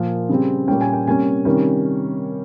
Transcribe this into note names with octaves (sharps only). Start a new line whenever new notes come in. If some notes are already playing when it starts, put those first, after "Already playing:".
Already playing: A#2 F3 A#3 F5
C#3 G3 C4
A#2 G3 A#3 C#4 G5
G#5
G5
C3 G3 A#3 C#4 G#5
C3 D#3 G3 C#4